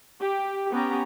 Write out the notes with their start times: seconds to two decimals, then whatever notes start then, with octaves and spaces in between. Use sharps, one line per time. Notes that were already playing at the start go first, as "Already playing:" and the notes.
0.20 G4
0.72 B3 C#4 G4 A#5